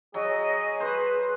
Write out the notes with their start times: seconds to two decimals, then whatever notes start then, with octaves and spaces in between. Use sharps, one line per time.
0.14 F#3 G#4 D#5
0.80 B4 C5